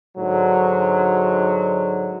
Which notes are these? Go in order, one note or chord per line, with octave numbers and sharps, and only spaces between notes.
G#2 D3 F#3